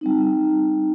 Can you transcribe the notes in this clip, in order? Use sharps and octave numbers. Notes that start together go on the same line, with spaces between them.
G3 C4 D#4